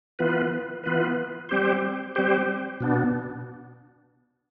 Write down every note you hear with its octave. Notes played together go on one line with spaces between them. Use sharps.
E3 B3 F4 B4
E3 B3 F4 B4
G3 C4 G4 C5
G3 C4 G4 C5
B2 B3 D4